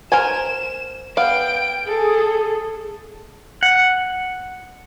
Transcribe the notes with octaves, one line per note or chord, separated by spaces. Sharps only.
A#4 C5 G#5 E7
B3 F5 G5 D7
G#4 A4
F#5